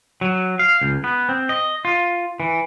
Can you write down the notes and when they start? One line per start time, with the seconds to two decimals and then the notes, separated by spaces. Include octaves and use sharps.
0.21 F#3
0.59 F5
0.82 C#2
1.04 B3
1.29 C4
1.49 D#5
1.85 F4
2.40 E3